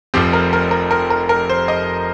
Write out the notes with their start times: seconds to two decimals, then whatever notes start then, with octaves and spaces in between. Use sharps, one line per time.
0.14 F1 F2 F3 C4 G4
0.33 A#4
0.53 A#4
0.71 A#4
0.91 A#4
1.10 A#4
1.29 A#4
1.49 C5
1.68 D#5